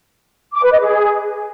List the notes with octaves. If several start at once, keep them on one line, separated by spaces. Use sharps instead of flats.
D6
B4
D#5
G#4